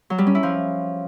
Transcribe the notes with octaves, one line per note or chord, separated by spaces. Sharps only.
F#3
G3
C#4
E4
F3